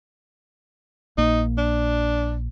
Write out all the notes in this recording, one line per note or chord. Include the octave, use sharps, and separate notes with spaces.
A#1 A#3 D#4
D4